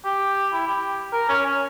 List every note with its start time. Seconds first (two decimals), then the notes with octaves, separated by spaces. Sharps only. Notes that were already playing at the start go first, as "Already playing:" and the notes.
0.05 G4
0.53 E4
0.67 G4
1.13 A#4
1.29 C#4
1.46 C#4